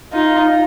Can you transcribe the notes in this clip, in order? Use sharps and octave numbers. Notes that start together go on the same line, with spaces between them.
D#4 F4